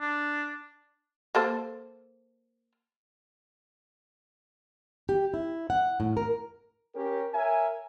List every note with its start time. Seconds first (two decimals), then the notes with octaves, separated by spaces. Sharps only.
0.01 D4
1.35 A#3 A4 C5
5.09 G4
5.34 E4
5.70 F#5
6.00 A2
6.17 A#4
6.95 C#4 G4 A#4
7.34 A#4 C#5 E5 G#5